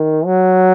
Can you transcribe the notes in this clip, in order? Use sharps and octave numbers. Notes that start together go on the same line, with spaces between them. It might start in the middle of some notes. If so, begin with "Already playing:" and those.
Already playing: D#3
F#3